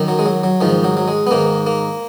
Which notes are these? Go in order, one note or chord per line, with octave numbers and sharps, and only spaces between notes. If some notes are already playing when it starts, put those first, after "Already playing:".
Already playing: F#2 D#3
F#3
G#3
F#3
F#3
G#2 D#3 F3
F#3
F#3
G#3
B3
G#2 D#3 A#3
A#3